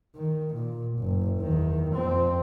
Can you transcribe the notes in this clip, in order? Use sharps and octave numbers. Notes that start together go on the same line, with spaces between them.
D#3
A#2
F#1
E2 D#3
F2 C4